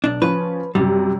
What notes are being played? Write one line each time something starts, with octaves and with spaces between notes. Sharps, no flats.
B1 D4
F3 C#4 B4
F#2 C3 G3